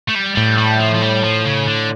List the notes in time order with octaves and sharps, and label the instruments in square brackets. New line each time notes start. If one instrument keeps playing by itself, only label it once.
[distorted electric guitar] A3
G3
[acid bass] A2 [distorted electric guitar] G3
[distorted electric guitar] G3
F3
F3
G3
F3
C#3
D3